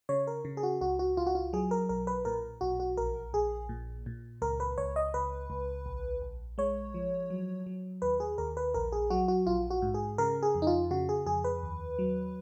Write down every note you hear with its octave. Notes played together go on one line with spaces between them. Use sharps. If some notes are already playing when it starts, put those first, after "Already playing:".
C#3 C#5
A#4
C#3
G#4
F#4
C#2 F#4
F#4
C#2 F4
F#4
F4
F#3 G#4
A#4
B1 A#4
B4
A#2 A#4
B1 F#4
F#4
A#1 A#4
A#1 G#4
A#2
A#2
C#2 A#4
B4
C#2 C#5
D#5
C#2 B4
C#2
A#1
A#1
G#3 C#5
F3
F#3
F#3
D#2 B4
G#4
D#2 A#4
B4
A#1 A#4
G#4
F#3 F#4
F#4
A#1 F4
F#4
G#2
G#4
C#3 A#4
G#4
F2
D#4
F4
C#3 F#4
G#4
F2 G#4
B4
D#2
F#3